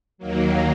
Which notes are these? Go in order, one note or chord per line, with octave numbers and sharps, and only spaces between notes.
D#2 D#3 F#3 A#3